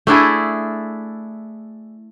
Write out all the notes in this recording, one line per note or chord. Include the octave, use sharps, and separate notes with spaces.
A3 D4 E4 G#4